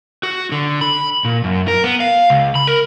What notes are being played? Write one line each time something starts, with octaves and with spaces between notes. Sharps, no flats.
F#4
D3
B5
A#2
F#2
A#4
B3
F5
C#2
B5
A#4